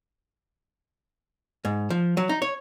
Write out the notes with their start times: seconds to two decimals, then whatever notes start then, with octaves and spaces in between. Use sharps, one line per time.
1.65 G#2
1.90 F3
2.17 F#3
2.29 D#4
2.42 C#5